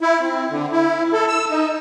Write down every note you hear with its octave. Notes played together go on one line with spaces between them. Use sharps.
E4
C4
D3
E4
A4
E6
D#4